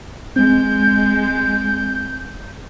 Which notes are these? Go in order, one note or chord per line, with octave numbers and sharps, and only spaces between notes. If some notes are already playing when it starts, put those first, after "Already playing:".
G#3 C4 G6